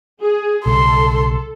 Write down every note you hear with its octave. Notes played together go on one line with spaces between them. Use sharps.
G#4
B1 C#3 G3 A4 C6